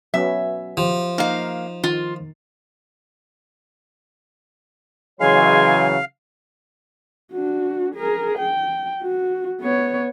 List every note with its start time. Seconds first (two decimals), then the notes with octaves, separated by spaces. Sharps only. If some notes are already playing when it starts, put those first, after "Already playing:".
0.14 F#3 B3 C#4 E5
0.77 F3 G4
1.18 A#3 D#4 F5
1.84 D#3 F4
5.20 C#3 E3 F#3 G#3 C#5 F5 G#5 C6
7.33 D4 F#4
7.94 G#4 A#4
8.38 G5
9.02 F#4
9.61 B3 C#5